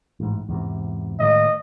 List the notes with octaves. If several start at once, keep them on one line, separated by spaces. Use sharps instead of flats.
A1 G#2
E2 G#2 C3
A2 D#3 G#3 D#5